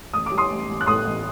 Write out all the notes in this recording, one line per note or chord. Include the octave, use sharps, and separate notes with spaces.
A1 D#6
D6
G3
C6 D#6
A1
A1
F#6
A2 C6 D#6
A1